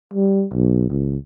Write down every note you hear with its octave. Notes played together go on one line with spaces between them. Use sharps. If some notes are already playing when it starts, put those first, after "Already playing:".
G3
B1
C#2